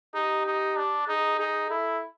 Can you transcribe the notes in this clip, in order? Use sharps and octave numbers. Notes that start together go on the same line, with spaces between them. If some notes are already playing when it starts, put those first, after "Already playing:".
D#4 G4
D#4
D4
D#4 G#4
D#4 G#4
E4 A4